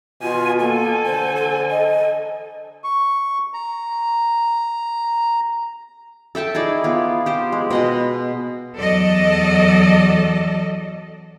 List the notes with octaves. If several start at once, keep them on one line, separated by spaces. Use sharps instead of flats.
B2 F4 G#5
A#3 A4 G#5
D3 C5
C5
D#5
C#6
A#5
A4 E5 G5 A5
D#4 E4 G#4 D5
B3 F4
G4 C5
G#3
B2 D#5 F#5
E2 F#3 A4 D5 D#5